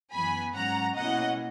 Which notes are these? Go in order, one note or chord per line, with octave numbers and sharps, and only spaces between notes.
F#2 E3 B3 G#5 B5
G#2 F#3 C#4 F#5 A#5
B2 A#3 C#4 E4 D#5 F#5